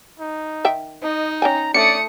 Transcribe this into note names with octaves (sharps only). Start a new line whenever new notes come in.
D#4
D#3 E5 G5
D#4 D#5
C#4 G5 G#5 A#5
A3 C#4 D4 D5 D#6 C#7